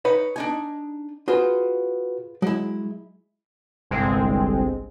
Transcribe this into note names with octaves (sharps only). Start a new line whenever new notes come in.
D#4 B4 C#5
D4 D#4 G#5
F4 F#4 G#4 B4 C5
F#3 G#3 E4
G1 C2 G#3 C4